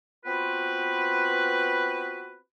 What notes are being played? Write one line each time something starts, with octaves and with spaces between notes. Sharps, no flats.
B3 C4 F4 F#4 B4